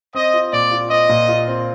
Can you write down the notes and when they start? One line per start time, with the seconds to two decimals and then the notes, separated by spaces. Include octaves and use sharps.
0.15 C4 D#5
0.34 F4
0.53 A#2 D5
0.71 F4
0.90 C4 D#5
1.09 A#2
1.28 F4
1.48 C4